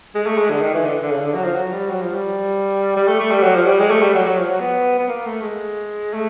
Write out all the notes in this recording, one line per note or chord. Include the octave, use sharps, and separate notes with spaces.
G#3
A3
G#3
D3
D#3
E3
D3
D3
C#3
D3
F#3
F3
F#3
G3
F#3
F3
G3
G3
A3
A3
G3
F#3
F3
G3
G#3
A3
G3
F#3
F#3
F3
F#3
B3
B3
A#3
A3
G#3
A3